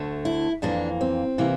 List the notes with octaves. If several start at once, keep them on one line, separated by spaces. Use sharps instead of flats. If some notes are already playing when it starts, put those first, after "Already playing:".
Already playing: D2 D3 A3
E4
F2 E3 A#3 D4
C4
C3 E3 A#3